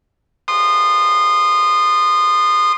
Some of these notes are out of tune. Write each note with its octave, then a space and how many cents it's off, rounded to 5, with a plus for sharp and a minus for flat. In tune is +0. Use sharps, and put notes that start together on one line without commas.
C6 +0 D#6 -25